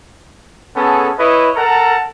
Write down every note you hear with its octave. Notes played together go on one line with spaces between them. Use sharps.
B3 C#4 G#4 A4
E4 B4 C#5 D#5
A4 A#4 F#5 A5 A#5